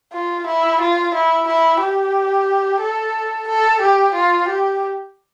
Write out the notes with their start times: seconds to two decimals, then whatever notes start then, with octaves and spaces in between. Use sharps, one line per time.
0.13 F4
0.47 E4
0.81 F4
1.15 E4
1.48 E4
1.80 G4
2.81 A4
3.48 A4
3.81 G4
4.15 F4
4.48 G4